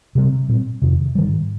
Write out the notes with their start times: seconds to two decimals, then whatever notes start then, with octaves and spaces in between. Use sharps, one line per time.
0.15 C3 G3 C4
0.48 A#2 G3 C4
0.82 F2 C3 D#3
1.15 G#2 D#3 G3